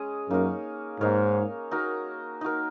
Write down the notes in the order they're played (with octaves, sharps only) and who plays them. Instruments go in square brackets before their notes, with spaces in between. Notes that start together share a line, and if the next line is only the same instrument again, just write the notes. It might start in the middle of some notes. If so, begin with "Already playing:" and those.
Already playing: [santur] G#3 C#4 G#4 D#5
[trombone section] F#2 [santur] A#3 D#4 A#4 C#5
[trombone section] G#2 [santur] A#3 D#4 A#4 C#5
[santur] D#4 F#4 A#4
D#4 F#4 A#4